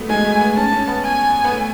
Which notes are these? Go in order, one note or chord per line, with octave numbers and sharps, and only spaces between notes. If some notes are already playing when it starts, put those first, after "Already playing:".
Already playing: F#3 A3 B3
G#3 G#5
A3
B3
C#4 A5
C#4
B3
G#5
B3
A3